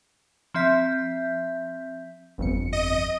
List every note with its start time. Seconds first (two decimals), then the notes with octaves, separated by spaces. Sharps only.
0.54 F3 C4 E5 G6 B6
2.38 G1 F2 C#7
2.73 D#5 D#7